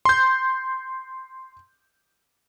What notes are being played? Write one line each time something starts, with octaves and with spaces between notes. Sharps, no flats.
C6 G6